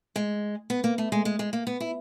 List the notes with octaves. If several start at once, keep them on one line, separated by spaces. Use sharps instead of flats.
G#3
B3
A#3
A3
G#3
G#3
G#3
A#3
B3
E4